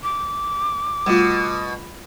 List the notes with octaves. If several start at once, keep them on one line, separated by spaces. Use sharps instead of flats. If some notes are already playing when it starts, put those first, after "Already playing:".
D6
B2 G3 A3 F4